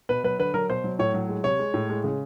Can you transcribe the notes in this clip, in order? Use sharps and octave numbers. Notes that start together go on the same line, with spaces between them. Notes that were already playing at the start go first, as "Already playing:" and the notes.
B2 B4
F#3 B4
D3 B4
F#3 A#4
B2 C5
F#3
A2 C#5
F#3
G#3
C3 C#5
G#3
A2
G#3
C#3